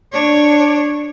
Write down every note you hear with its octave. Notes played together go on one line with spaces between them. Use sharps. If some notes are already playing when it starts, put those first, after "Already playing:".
D4 C#5